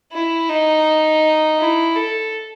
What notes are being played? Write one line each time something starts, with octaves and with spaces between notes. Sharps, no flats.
E4
D#4
E4
A4